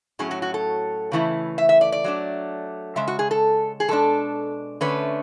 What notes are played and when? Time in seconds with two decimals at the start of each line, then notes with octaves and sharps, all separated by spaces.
0.19 A2 F#3 C#4 G#4
0.31 F#4
0.42 F#4
0.54 A4
1.12 C#3 E3 A3 E4
1.58 E5
1.69 E5
1.81 D5
1.92 D5
2.04 F#3 A3 D4
2.96 C#3 G#3 E5
3.08 F#4
3.19 G#4
3.31 A4
3.80 G#4
3.88 B2 G#3 D4 A4
4.81 D3 A3 C#4 B4